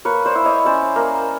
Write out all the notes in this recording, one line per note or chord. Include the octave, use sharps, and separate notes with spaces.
A#3 B4 C#5
C5 D5
E4
C#5 D#5
C#4 C5 D5
A#3